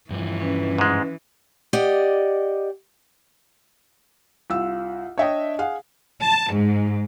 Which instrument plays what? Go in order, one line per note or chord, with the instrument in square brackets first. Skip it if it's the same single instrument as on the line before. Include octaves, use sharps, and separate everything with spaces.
[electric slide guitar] G2 F3 [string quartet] E3
[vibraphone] C#4 B4
[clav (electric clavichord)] G#2 G#3
[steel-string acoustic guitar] G4 D5 D#5 F#5
[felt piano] C2 E6 [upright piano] F4
[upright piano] D4 D#5 [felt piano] C#5 E5 G5
[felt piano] G#4 F5 F#5
[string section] A5
G#2